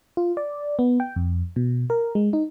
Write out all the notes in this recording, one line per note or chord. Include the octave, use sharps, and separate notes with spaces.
F4
D5
B3
G5
F2
B2
A#4
G#3
D#4